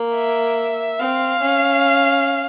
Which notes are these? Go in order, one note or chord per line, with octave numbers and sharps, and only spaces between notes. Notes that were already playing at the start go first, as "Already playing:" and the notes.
Already playing: A#3
E5
C4 F5
C#4